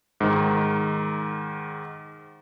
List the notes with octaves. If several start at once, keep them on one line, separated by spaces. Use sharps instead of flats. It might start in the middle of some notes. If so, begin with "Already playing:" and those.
G#2 D#3